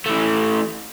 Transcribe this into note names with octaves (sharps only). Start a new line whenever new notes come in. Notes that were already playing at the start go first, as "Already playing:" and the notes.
E3 A3